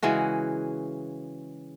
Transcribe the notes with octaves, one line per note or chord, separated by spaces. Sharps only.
C#3 E3 G#3 F#4